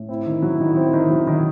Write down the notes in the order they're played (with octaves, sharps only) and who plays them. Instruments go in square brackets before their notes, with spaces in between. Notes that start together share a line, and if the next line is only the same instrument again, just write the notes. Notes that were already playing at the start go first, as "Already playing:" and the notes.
Already playing: [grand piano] A2
[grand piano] C4 [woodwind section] E4
[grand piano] D#3
F#3
D#3
C4
D#3
F#3
[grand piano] D#3 [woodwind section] D#4
[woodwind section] E4